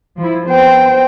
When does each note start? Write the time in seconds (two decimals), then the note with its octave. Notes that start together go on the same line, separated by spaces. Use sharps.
0.18 F3 E4
0.48 B3 C5 G5